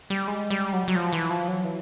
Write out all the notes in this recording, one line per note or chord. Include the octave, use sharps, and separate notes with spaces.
G3
G#3
G3
F#3
F#3
F3
E3
F3
F#3
E3